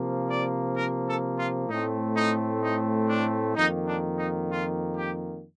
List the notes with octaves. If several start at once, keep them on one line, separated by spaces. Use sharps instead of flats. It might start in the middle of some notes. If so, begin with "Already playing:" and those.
Already playing: C3 F3 A#3
D5
A#4
A4
F4
A2 A3 C4 D#4
D#4
D#4
D4
F2 D#3 A#3 D#4
D4
D#4
F4
G4